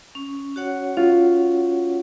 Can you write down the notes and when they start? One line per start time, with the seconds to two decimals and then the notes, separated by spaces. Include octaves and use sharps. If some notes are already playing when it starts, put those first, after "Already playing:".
0.15 C#4
0.56 F#4 C#5 F#5
0.97 C#4 F4